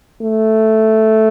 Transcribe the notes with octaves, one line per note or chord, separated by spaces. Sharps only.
A3